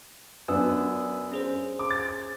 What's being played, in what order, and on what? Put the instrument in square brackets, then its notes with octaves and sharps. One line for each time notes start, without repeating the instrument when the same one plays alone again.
[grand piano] F#2 B3 D4 [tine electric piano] G#5 D#6 E6
[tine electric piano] C#4 G#4 C5
[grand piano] D6
A6